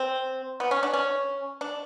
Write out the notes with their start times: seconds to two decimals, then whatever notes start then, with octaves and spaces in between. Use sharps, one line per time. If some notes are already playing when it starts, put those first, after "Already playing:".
Already playing: C4
0.60 B3
0.71 C#4
0.83 D4
0.93 C#4
1.61 D4